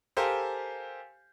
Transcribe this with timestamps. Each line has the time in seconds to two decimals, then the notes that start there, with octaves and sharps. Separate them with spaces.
0.17 G4 A4 A#4 C5 F5 G#5